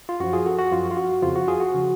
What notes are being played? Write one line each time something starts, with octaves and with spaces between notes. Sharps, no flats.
F4
F#2 F3 F#4
F4 G#4
F#4 A4
F#4
F#2 F3 F4
F4
F#4
F2 C#3 F3 F4
F#4
F4 G#4
F#4
C#3 F3